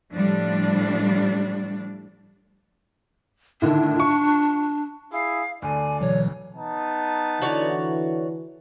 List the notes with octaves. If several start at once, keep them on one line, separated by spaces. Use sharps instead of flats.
A2 F3 G3 D4
A2 D3 D#3 D4
F4 C#6
E4 G#4 F5
D2 D3 D5 G#5
B2 E3 F#3 C#5
B3 D#4 A5
D3 E3 F#4 C#5 D5